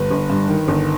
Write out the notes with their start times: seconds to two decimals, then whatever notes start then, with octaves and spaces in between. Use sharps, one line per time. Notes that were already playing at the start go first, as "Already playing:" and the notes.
Already playing: G1 G2 B4
0.11 G1
0.30 G2
0.48 D#3
0.68 G1